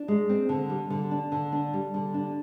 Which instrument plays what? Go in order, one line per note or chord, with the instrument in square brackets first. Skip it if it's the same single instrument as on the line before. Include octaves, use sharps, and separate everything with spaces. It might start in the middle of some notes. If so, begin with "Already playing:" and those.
Already playing: [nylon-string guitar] D4
G#3
C4
D3
G3
D3
D4
D3
D4
G3
D3
D4